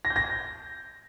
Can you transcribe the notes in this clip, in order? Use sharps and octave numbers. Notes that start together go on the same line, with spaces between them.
A#6
G6
A#6